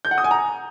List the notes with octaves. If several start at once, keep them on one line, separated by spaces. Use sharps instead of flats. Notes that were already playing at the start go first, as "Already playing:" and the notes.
G6
F#5
D#6
G#5
A#5